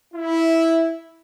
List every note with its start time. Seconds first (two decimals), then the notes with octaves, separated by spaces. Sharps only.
0.14 E4